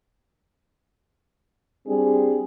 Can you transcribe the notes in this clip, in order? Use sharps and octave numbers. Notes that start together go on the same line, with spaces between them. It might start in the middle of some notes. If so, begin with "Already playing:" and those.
G3 C4 D4 G4 G#4